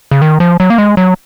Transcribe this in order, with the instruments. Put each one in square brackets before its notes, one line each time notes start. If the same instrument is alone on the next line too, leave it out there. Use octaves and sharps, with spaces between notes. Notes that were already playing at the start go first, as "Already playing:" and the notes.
[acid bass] C#3
D#3
F3
F#3
A#3
G#3
F#3